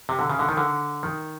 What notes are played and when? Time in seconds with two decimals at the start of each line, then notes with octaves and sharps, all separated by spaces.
0.09 C3
0.19 D3
0.29 C#3
0.39 D3
0.49 D#3
0.57 D3
1.03 D#3